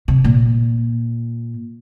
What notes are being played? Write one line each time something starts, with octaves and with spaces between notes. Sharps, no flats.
C3
A#2